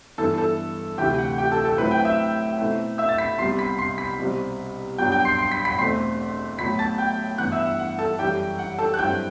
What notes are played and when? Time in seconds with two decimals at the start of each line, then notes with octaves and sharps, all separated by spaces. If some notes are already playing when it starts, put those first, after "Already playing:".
0.18 G2 E3 B3 E4 A4 A5
0.38 A4 A5
0.98 D2 C3 E3 A3 E4 G4 G5
1.18 F#5
1.38 G4 G5
1.51 A4 A5
1.65 A4 A5
1.78 A2 F#3 C4 E4 B4 B5
1.91 G5 G6
2.05 E5 E6
2.58 B2 A3 C4 E4
2.98 E5 E6
3.09 A6
3.18 B5 B6
3.38 C2 C3 G3 B3 C6 C7
3.58 B5 B6
3.78 C6 C7
3.98 B5 B6
4.19 C2 B2 G3 C4
4.98 G2 F#3 B3 D4 G5 G6
5.12 G5 G6
5.25 C6 C7
5.39 C6 C7
5.52 B5 B6
5.65 B5 B6
5.78 E2 B2 A3 C4 C6 C7
6.58 A2 F#3 B3 B5 B6
6.79 A5 A6
6.98 G5 G6
7.38 G2 E3 B3 E4 F#5 F#6
7.52 E5 E6
7.66 F#5
7.79 F#5
7.99 A4 A5
8.19 F#2 E3 G3 G4 G5
8.59 F#5
8.78 A4 A5
8.94 F#6
8.98 G2 F#3 C4 E4 G5 G6